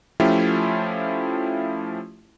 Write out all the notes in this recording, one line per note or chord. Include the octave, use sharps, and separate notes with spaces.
F3 A3 C#4 E4 F4 G4